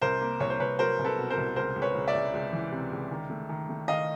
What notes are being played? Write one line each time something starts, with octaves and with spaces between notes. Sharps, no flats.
C2 A#4 C5
A#3
C2 C#5
C5
C2 B4 C#5
F#3 A#4 C5
C2
A4 B4
B2
A#4 C5
C2
C#2 A#4 C5
C#2
B4 C#5
C#2
D5 E5
C#2
C#2
E3
C3
C#2
D#3
A3
D#3
A3
D#3 D#5 F5